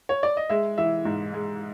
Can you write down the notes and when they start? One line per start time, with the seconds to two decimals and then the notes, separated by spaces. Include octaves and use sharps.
0.09 C#5
0.23 D5
0.37 D#5
0.49 G#3 E5
0.78 E3 E5
1.05 G#2
1.34 G#3